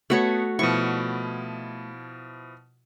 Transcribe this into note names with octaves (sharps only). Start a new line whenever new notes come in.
A3 B3 F#4 C#5
B2 F3 E4 C#6